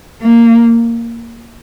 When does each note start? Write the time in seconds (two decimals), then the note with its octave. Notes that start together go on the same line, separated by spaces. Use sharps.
0.22 A#3